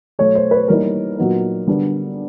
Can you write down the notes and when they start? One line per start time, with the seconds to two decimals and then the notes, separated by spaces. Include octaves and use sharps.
0.19 B2 F#3 A3 C#5
0.35 C5
0.51 B4
0.68 E3 G3 A#3 D#4 A#4
1.18 A#2 F#3 B3 D#4
1.67 D3 G3 B3 D4